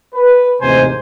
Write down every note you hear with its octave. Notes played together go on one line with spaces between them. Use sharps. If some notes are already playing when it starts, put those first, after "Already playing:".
B4
A1 D#2 G#2 C3 C5 G#5